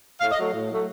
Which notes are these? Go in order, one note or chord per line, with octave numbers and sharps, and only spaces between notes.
A2 F5
D#5
F#3 A3
A2
F#3 A3